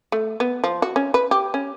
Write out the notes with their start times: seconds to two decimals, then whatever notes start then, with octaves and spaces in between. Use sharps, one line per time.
0.12 A3
0.40 B3
0.64 F3
0.82 F#4
0.96 C#4
1.14 B4
1.31 G4
1.54 C#4